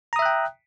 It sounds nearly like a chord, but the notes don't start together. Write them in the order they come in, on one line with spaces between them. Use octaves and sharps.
A#5 D#6 E5 F#6 G5